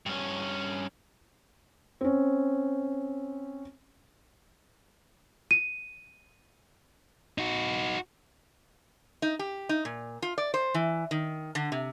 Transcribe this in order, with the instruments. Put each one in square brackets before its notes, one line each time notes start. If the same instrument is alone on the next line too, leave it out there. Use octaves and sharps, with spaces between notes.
[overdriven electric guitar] G2 C#4
[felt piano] C4 C#4
[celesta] D#7
[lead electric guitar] D#4 F#4
[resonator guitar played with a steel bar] D#4
G4
D#4
A#2
F4
D5
C5
E3
D#3
D3
C3